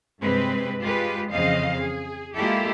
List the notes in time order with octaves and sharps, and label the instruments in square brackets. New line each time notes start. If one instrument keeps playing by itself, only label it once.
[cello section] G2 C3 G#3 C4 B4
G#3 F4 G4 B4
F2 C#3 E3 C4 D#5 F5
G#4
G#3 A#3 E4 F4 G4 A4